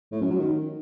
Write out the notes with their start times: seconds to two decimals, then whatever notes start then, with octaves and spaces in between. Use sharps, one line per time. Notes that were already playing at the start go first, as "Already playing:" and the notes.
0.12 A2
0.21 F#2
0.30 F#3
0.40 D#3